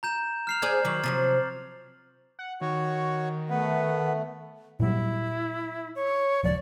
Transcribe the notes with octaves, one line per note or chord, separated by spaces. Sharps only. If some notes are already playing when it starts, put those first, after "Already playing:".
A#5 G6 E7
F6 C7 F7
G#4 C5 D5 G6 G#6
D#3 F#3 D6 F#7
C3 F3 F#3 A6
F#5
D#3 F#4 C#5
A3 B3 B4 F#5
A#2 F#3 G3 E4
C#5
D#1 C#2 F3 D5